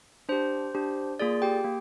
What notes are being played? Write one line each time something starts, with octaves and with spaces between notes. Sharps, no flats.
D4 G4 C5
D4 G4
A#3 F4 G#4 D5
G4 G5
A#3